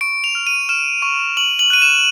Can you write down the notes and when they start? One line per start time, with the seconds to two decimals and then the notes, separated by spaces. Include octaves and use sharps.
0.01 C#6 D7
0.24 F7
0.35 F6
0.47 D#7
0.69 F6 E7
1.02 C#6
1.37 C#6 F#7
1.59 F#7
1.70 F#6 D#7
1.82 E7